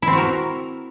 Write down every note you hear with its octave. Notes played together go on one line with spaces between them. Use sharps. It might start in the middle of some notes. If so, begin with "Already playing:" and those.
E4
C4
F#4
A#4